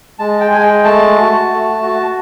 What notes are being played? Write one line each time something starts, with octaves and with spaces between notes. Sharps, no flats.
G#3 A5
G5
G#3 G#5
G5
A3 A5
F#4
A3
F#4